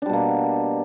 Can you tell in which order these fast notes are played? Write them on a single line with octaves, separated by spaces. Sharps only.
D4 G3 B2 A#3